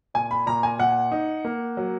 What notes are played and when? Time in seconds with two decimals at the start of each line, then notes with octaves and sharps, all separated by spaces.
0.14 A#2 G#5
0.31 B5
0.47 A#2 A#5
0.63 G#5
0.79 A#2 F#5
1.12 D#4
1.45 A#3
1.77 F#3